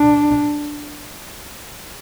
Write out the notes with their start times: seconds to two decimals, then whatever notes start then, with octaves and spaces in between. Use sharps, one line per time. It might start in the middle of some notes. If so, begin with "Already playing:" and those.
Already playing: D4